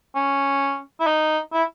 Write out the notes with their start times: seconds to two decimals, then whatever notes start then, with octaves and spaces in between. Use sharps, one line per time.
0.15 C#4
1.00 E4
1.07 D#4
1.53 E4